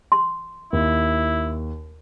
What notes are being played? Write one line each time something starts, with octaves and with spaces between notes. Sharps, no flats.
C6
D#2 E4